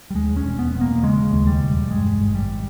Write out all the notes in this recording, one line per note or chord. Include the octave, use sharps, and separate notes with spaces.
G3
D#2 G#3
C#4
E1
B3
E1
A#3
C#3 G#3
D#2
G3
E1
G2 G#3
G#1
G3